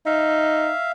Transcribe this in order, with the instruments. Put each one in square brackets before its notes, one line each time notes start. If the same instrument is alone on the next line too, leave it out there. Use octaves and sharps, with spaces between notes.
[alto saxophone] D#4 [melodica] E5 F5